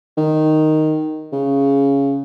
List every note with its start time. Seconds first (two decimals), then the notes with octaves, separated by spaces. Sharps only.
0.17 D#3
1.32 C#3